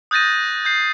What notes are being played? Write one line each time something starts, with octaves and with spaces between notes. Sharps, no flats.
D#6 F#6 G6 A6 A#6 D#7
G6 C7